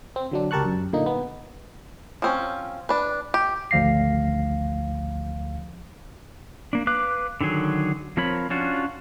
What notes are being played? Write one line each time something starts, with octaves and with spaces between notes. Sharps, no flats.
C4
D3 F#3 D4
C#2 G4 A#4 A5 C#6 F#6
F#2
A#2 D3 A#3 D#4
B3
F3 C4 C#4
D4 B4
G4
G#1 D2 F3 F5 A#6 C7
A#3 D4
B4 F5 D6 F#6
D3 D#3 F#3 G#4
F3 C4 A#4 C#5 B5
C#4 D4 F4 F#4